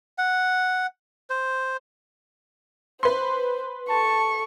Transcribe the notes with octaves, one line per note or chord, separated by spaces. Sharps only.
F#5
C5
B4 C5 C6
A4 A5 C#6